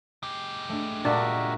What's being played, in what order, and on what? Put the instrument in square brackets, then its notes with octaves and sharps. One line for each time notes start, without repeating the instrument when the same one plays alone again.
[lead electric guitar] G#3 G4 [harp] C7
[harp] A3 D4
[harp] A#2 [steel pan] D4 [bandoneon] F#4 A#4 E5